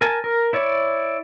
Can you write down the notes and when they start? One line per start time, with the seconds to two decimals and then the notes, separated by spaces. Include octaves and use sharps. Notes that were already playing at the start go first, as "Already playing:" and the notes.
0.01 A#4 G#5 A5
0.24 A#4
0.53 E4 C#5 D5